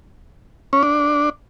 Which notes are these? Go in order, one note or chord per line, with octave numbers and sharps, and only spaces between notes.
C#4
D4